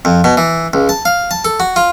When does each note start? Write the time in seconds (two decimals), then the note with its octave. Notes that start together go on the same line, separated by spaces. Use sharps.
0.05 F2
0.24 B2
0.37 E3
0.73 C#2
0.89 A5
1.05 F5
1.31 A5
1.45 A4
1.60 F#4
1.76 F4